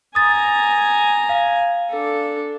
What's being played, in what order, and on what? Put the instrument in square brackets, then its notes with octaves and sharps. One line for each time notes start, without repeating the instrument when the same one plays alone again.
[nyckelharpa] G#5 A#5 [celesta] D#6 A6
[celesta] F5
[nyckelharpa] D4 A4